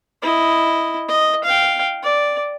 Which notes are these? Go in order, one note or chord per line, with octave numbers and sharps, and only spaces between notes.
E4 D#5
D#5
F5 G5
D5